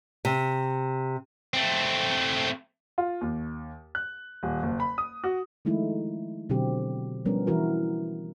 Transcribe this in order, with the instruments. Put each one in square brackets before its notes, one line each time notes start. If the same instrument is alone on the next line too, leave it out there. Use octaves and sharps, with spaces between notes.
[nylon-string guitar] C3
[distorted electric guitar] A3 C4
[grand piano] F4
D#2
F#6
D#1
F#1
B5
D#6
F#4
[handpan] D#3 F3 G#3 A3 D#4 E4
B2 D3 F#3 C4 G4
F3 G3 B3 C#4 D4 A#4
E3 E4 F#4 A#4